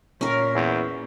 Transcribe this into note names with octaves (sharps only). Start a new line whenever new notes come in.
A#2 C#4 A#4
E2